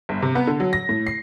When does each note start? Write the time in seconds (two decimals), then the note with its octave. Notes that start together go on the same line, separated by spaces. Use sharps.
0.09 G1
0.22 C3
0.35 B3
0.47 D3
0.60 F#3
0.73 A#6
0.89 A2
1.07 C7